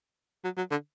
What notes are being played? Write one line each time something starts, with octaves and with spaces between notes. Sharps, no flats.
F#3
F#3
D3